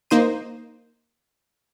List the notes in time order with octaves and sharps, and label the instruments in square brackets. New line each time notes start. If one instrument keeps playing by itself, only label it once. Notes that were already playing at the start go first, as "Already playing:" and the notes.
[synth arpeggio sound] A#3 D#4 C5 D#7